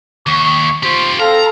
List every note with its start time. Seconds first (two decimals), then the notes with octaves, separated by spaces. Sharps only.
0.27 D#2 C#6
0.83 F4 G4 C5
1.20 C4 A4 F5 A#5